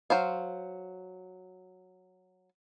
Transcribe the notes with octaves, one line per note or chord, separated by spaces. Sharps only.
F#3 C5 F5